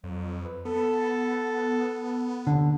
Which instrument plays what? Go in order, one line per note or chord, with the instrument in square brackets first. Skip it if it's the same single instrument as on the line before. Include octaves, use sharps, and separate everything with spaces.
[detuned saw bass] F2 [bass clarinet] F#3
[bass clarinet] B4
[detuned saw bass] B3 [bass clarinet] A4
[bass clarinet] D#2 [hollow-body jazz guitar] D3